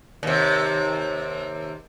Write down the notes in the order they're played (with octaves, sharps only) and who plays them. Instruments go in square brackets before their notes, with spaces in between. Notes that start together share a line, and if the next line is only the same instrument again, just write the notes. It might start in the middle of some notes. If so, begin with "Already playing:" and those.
[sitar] D#2 C3